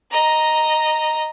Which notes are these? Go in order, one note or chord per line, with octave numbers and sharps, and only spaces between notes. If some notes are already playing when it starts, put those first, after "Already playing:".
D#5 A#5